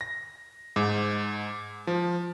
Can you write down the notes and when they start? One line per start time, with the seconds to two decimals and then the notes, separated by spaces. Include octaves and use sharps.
0.01 A#6
0.76 G#2
1.87 F3